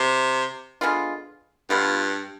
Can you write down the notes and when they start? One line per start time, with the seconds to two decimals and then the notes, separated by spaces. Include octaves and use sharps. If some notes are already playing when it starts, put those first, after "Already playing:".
Already playing: C3
0.81 D3 G#3 B3 F4
1.70 G2 F3 B3 F4